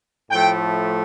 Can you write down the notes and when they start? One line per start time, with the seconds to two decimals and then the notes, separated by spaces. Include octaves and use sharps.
0.30 A2 F3 A3 G5